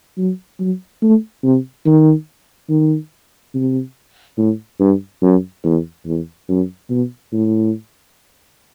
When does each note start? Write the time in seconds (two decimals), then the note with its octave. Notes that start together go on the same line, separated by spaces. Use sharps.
0.17 F#3
0.60 F#3
1.03 A3
1.44 C3
1.86 D#3
2.70 D#3
3.55 C3
4.38 A2
4.80 G2
5.22 F#2
5.65 E2
6.06 E2
6.49 F#2
6.90 B2
7.33 A2